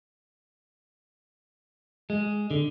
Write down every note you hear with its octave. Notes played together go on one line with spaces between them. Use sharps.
G#3
D3